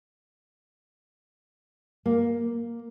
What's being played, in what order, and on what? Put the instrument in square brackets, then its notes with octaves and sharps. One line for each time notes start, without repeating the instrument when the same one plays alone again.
[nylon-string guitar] A#3